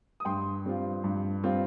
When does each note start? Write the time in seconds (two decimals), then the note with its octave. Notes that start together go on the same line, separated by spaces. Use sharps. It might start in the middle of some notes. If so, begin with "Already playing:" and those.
0.20 D#6
0.25 G2 G5 C6
0.65 G3 C4 F4
1.04 G2
1.44 G3 C4 F4